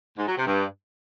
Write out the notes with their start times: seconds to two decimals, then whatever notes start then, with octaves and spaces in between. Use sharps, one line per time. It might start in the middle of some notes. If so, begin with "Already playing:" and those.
0.18 G#2
0.27 F#3
0.36 C3
0.45 G2